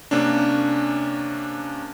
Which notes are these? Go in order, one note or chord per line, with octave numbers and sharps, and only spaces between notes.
C3 A#3 C#4 D4